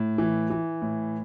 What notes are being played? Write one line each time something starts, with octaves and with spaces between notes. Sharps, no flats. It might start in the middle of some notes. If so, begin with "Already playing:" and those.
Already playing: A2
E3
E3
A2